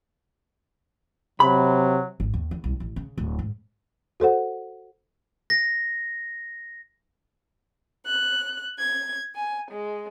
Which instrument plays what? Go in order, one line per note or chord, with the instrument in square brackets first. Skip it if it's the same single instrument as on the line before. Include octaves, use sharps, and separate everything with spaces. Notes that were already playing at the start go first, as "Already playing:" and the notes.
[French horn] C3 [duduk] F#3 [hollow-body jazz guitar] B5
[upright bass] G#1
D#2
E2
C2
A1
C#3
D1
G#2
[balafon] F#4 A4 C5 F#5
[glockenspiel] A#6
[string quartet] F#6
G#6
G#5
G#3